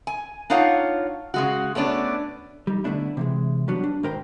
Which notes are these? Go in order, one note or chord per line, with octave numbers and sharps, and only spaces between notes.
G#5
D4 D#4 F4 C#5 F5 F#5
C#3 G#3 F#4
A3 B3 C#4 D4
G3 D#4
D3 A3 B3 D4 E4
C3 E3 G#3
F#3 G3 B3 D4 F#4
D4
G#2 D#3 A#4 C5 G5 B5